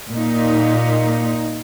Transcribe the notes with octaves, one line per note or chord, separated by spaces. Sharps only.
A#2 D#4